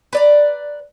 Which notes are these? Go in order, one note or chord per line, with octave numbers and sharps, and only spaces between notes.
B4 D5 A#5